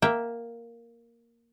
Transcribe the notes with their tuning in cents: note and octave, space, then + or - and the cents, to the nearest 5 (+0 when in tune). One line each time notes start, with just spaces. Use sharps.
A#3 +0 E5 +0 G5 -10